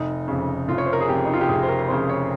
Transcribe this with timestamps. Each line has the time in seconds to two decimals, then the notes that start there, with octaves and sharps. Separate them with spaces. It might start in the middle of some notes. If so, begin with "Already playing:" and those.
Already playing: F1 D#4
0.28 F2 C#3
0.68 F1 F4
0.78 C#5
0.86 C5
0.93 A#4
1.01 G#4
1.08 F2 C#3 G4
1.26 D#4
1.34 F4
1.41 G4
1.48 F1 G#4
1.63 C5
1.69 A#4
1.88 F2 C#3 C5
2.09 C#5